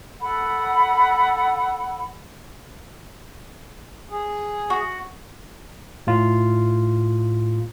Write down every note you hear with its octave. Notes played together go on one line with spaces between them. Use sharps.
A4 F#5 B5
G#4
F#4
A2 F4